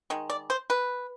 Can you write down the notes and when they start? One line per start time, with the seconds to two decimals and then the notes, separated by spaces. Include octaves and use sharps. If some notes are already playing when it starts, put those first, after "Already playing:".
0.10 D#3 G#3
0.30 D5
0.50 C5
0.70 B4